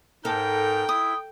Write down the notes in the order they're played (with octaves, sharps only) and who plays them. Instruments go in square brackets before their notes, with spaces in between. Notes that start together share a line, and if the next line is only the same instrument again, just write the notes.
[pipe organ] G#2 D#4 A#4 [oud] A4 [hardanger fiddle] G5
[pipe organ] E4 [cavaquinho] D#6